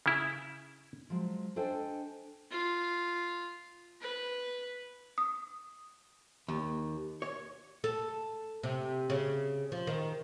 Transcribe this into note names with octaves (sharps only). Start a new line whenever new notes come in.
C#3 E4
F3 F#3 G#3
D4 A4 C5 D#5 G5 G#5
F4
B4
D#6
D#2
C#5
A4
C3
C#3
F3
D#3